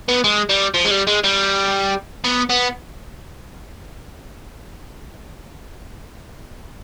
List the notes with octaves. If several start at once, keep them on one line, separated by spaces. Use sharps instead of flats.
B3
G#3
G3
F3
G#3
G3
G#3
G3
B3
B3